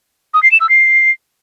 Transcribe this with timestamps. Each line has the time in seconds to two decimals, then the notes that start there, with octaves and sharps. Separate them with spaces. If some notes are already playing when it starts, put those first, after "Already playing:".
0.34 D#6
0.43 C7
0.52 E7
0.61 E6
0.69 C7